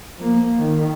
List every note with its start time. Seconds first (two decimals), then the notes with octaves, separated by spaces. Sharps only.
0.17 F3 A#3
0.59 D#3